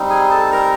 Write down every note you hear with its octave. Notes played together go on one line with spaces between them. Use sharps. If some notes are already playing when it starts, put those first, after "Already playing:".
Already playing: G3 C4 D#4
G#4 G#5
A4 A5
A#4 A#5